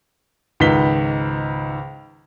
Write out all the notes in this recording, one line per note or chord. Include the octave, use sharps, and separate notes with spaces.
C#2 G#2 D#3 B4 B6 G7